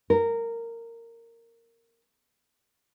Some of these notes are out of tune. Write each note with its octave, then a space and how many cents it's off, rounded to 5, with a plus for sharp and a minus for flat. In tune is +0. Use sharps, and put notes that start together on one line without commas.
A#4 -15